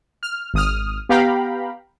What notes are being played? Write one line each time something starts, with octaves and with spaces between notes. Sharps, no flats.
F6
G#1 D#6 F6
B3 G4 F5 G5 A#5 B5